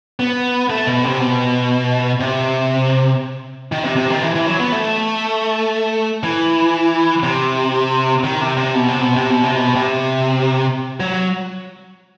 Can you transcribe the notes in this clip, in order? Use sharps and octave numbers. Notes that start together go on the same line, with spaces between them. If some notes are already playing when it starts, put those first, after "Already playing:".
B3
A3
B2
C3
B2
C3
D#3
C3
C3
D#3
E3
E3
F#3
B3
A3
E3
C3
D#3
C3
C3
B2
C3
B2
C3
B2
C3
B2
C3
F#3